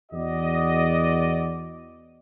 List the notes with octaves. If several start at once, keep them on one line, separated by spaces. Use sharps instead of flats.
E2 F#4 D5 D#5